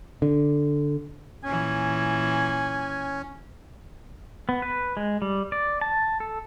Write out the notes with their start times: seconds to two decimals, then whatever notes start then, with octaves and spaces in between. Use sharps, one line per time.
0.22 D3
1.44 A#2 E3 C#4 G#5
4.49 B3
4.62 B4
4.97 G#3
5.22 G3
5.52 D5
5.81 A5
6.20 A4